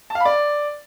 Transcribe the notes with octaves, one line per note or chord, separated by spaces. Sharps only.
A5
F5
B5
D5